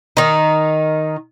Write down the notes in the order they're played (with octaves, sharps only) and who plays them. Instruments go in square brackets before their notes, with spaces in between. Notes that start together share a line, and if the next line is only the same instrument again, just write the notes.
[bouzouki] D#3 D#4